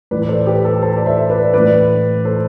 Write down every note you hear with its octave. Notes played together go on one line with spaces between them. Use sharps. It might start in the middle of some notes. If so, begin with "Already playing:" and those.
A2 E3 B4 D5
D5
A4 C5
G4 B4
A4
A4 C5
D5
C5 E5
B4 D5
A2 E3 B4 D5
A4 C5